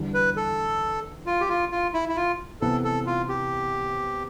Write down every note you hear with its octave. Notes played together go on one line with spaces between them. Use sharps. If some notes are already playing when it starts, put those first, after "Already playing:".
Already playing: E2 D3 G3
B4
A4
F4
G4
F4
F4
E4
E4
F4
C3 E3 B3 A4
A4
F4
G4